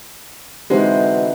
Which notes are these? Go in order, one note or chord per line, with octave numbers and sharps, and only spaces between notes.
B2 D3 E3 G#3 C4 D#4 C5